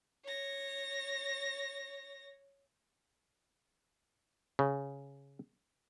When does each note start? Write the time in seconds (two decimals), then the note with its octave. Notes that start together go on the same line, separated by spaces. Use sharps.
0.25 C#5 A#6
4.59 C#3